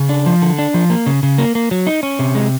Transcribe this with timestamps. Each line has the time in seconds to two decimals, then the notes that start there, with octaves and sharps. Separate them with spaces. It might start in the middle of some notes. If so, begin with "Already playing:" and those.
Already playing: C#3
0.09 D4
0.26 F3
0.42 D3
0.59 D4
0.74 F3
0.90 A#3
1.06 C#3
1.23 C#3
1.38 A#3
1.55 A#3
1.71 F#3
1.87 D#4
2.03 C#4
2.19 C3
2.35 G#3